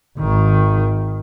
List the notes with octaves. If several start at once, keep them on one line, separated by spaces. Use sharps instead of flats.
G#1 D#3